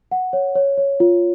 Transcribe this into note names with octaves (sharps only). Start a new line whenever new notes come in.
F#5
C#5
C#5
C#5
F4